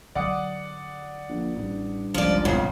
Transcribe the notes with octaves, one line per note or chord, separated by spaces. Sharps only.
D3 F#3 D5 F#5 D#6
A#1
A1 G2
G1 C#2 F3 D5
B1 F2 C#3